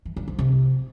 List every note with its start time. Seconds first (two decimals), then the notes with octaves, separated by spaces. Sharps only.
0.05 E3
0.17 G2
0.28 F3
0.39 C3